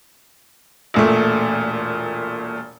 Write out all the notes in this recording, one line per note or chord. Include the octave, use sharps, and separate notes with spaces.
E1 A#2 A3